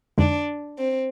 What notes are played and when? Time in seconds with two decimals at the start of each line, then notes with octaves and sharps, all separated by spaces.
0.18 F2 D3 G#3 D4 D#4
0.79 C4